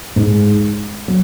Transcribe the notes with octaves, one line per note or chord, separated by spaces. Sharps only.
G#2 G#3
F#3